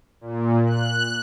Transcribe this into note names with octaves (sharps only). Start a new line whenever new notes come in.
A#2
F#6